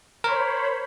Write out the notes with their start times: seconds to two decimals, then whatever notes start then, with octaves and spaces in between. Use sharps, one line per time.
0.24 A#4 C5 C#5 B5